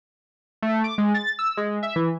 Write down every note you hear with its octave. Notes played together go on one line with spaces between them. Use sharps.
A3
D6
G#3
A6
E6
G#3
E5
E3